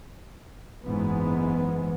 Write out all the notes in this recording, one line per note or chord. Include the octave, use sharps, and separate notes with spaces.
F#1 G#2 E3 G#3 B3